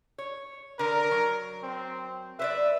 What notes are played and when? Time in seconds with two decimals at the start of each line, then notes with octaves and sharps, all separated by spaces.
0.18 C#5
0.79 D3 A#4
1.11 F#3
1.63 C4
2.39 B4 C5 D5 E5